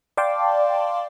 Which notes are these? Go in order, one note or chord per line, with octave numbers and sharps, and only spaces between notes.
D5 F5 G5 A5 C6 D6